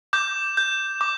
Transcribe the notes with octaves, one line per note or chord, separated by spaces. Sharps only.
D6 G6
G6
D6